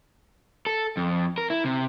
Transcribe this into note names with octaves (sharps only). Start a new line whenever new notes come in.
A4
F2
A#4
E4
C3